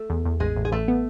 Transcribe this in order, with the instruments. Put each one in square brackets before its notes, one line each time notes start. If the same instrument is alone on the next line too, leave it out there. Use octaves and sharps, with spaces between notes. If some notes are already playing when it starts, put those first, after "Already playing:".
Already playing: [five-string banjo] A3 A4
[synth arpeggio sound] E2
E2
[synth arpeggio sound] A1 [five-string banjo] G#3 G#4
[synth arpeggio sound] A1
[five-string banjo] G#4
[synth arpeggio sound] A1 [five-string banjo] A3 A4
[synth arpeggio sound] B3